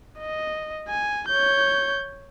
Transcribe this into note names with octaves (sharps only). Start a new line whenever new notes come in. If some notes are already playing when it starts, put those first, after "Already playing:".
D#5
G#5
C#5 G6